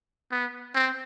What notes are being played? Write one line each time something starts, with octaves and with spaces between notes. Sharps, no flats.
B3
C4